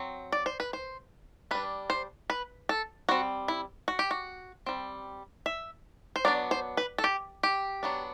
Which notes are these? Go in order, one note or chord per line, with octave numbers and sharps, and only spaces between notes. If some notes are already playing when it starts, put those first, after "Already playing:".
Already playing: F#3 C4
D5
C5
B4
C5
G3 D4 B4
C5
B4
A4
G3 C4 F#4
E4
F#4
G4
F#4
G3 C4
E5
C5
F#3 B3 D4 D5
C5
B4
A4
G4
G4
F#3 B3 D4